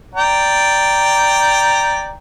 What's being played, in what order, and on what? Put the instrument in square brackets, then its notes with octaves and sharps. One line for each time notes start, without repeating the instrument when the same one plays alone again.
[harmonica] D5 G5 A#5